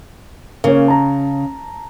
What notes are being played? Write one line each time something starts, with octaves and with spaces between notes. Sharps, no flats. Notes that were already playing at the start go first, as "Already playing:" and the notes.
C#3 A#3 C#4
A5 A#5